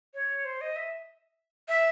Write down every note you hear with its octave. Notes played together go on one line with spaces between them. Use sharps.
C#5
C5
D#5
E5
E5